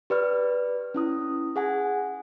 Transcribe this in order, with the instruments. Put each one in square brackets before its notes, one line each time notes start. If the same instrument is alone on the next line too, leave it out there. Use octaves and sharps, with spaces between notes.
[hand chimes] G4 B4 D5 F6
C#4 E4 D#6
G#4 F#5 G#5